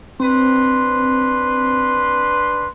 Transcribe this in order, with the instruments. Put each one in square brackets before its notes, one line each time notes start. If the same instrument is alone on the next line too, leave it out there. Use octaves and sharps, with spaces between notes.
[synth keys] C4 [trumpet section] D4 B4 C6